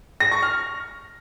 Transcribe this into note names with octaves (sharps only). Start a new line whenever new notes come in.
A#6
C#6
F6